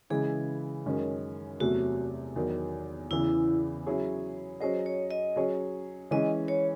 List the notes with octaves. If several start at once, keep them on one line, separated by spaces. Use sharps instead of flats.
C#3 E3 G#3 G#4
F#2 D#3 G#3 C#4
E2 C3 F#3 A3 F#4
E2 D#3 F#3
E2 C#3 E3 E4
F#3 C#4 E4 G#4 C#5
F#3 C#4 G#4 C5 D#5
C#5
D#5
F#3 C#4 G#4 C#5
E3 G#3 C#4 G#4 D#5
C#5